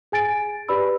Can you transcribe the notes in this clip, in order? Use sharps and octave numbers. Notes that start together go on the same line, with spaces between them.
G#4 G#5 A6 D7
G4 B4 D5 B5 E6